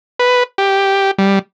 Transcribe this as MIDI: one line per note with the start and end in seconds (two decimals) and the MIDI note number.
0.19 0.43 71
0.58 1.11 67
1.18 1.39 55